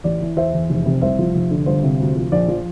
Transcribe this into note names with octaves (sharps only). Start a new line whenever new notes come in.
A1 D5
E3
E2 C5 E5
E2
F1
C3
C2 C5 E5
F3
F1
D3
G1 C5
C3
D2
F3
A#1 D5
F3